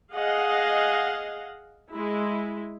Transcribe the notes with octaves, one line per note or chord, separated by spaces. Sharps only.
G#4 D#5 F5 F#5
G#3 E4